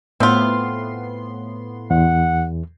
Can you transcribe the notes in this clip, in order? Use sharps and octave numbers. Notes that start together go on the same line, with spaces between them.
A2 B3 C4 F4 C6
E2 F#5